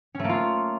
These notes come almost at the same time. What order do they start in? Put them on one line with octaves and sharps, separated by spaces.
C#4 A3 A#3 F4